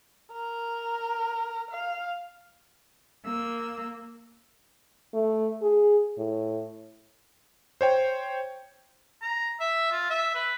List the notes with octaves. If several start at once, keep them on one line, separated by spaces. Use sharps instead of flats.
A#4
F5
A#3 E6
A3
G#4
A2
C5 C#5 G5
A#5
E5
F4
E5
B4